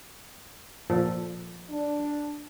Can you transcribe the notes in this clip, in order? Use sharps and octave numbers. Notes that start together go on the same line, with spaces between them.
A#2 F3 A4
D4